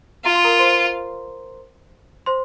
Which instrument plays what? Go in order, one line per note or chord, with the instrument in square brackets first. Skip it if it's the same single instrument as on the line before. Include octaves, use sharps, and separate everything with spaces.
[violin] F4 [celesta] A#5
[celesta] C6
A#4 A#5
C5 C6
C5 C6